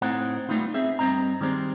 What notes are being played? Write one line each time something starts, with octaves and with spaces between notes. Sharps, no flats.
A2 C4 D#4 F#5
G3 A3 B3 D#4 F4
C4 G#4 E5
G2 A3 C4 D#5 A#5
D#3 G3 G#3 C4